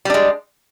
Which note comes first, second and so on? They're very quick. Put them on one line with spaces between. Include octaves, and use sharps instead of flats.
G3 D4 G#3